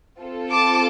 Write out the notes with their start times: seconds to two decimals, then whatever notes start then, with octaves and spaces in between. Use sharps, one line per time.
0.20 C4 F4 A4
0.51 A5 D6